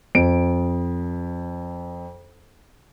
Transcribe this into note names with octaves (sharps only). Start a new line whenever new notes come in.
F2 D7